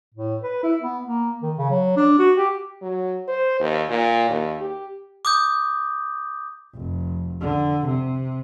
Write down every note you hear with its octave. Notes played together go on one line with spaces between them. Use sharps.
A2
B4
E4
B3
A#3
D#3
C#3
F#3
D4
F#4
G4
F#3
C5
D#2
A#2
D#2
G4
D6 D#6 G6
F1
D3
C3